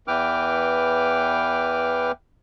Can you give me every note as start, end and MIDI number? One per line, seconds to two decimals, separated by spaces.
0.08 2.12 40
0.08 2.12 52
0.08 2.12 71
0.08 2.12 79
0.08 2.12 86
0.08 2.12 89